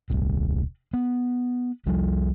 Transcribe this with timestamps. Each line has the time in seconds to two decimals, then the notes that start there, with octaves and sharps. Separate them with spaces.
0.10 D#1 C2 C3
0.93 B3
1.86 C2 F3 G3